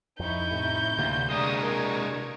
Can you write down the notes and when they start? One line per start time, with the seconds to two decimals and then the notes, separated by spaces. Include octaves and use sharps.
0.20 F2 D#4 E4 C#6 G6
0.51 A2 C3
0.98 D2 C3 A#3
1.31 G#3 D4 A#5 C#6 D#6 G#6
1.61 A#4